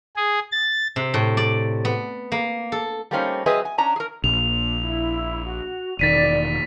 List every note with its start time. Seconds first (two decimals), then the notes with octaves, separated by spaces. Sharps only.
0.16 G#4
0.51 A6
0.96 C3
1.14 A2
1.37 D5
1.85 B3
2.32 A#3
2.72 A4
3.11 G3 A3 A#3 C4 C#4 D#4
3.46 F#3 C4 G#4 B4 D#5 E5
3.65 G#5
3.78 C#4 D4 A#5
3.96 G#4 A#4
4.24 A#1 F7
4.81 E4
5.45 F#4
5.99 E1 D#3 D5 A6 B6 D#7